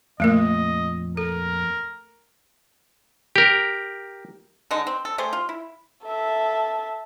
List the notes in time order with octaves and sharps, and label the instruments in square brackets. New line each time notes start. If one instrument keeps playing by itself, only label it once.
[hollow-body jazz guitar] F2 A#2 [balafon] A3 A#3 A#4 [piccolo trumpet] D#5
[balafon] A4 [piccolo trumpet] A#4
[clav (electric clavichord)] G4 A#4
[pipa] D3 G#3 D4 D#4
C4
A4
A3 G4 G#4 C5
F4
E4
[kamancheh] A4 E5